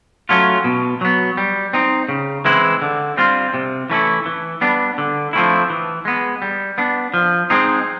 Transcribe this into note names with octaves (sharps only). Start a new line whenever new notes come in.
F#3 A3 C#4 F4
B2
F#3 B3
G3
C4 D#4
C#3
E3 G#3 C4 E4
D3
G3 C4 F4
C3
E3 A3 C#4 E4
E3
G3 B3 D4
D3
F3 A3 C4 E4
E3
G#3 B3
G3
B3 D4
F3
G#3 C4 D#4 G#4